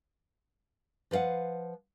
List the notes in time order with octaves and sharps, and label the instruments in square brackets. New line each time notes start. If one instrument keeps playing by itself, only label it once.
[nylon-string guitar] F3 B4 D5 F5 F#5